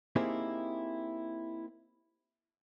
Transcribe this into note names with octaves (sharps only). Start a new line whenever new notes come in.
A#3 C4 D#4 E4 G4 G#4